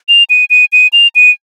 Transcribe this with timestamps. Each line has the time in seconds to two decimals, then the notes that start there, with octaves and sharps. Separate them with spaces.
0.09 F7
0.30 D#7
0.50 D#7
0.72 D#7
0.93 F7
1.15 D#7